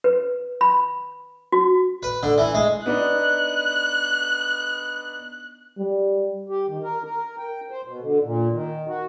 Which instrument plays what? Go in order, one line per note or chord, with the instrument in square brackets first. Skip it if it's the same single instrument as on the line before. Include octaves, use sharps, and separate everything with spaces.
[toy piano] B4
B5
F#4
[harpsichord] B4
D3
E3
G#3
[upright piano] B3 D4 D#4 [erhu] F#6
[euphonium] G3
[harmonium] G4
D#3
A#4
A#4
G5
C5
B2
D3
A#2
D#3
F#4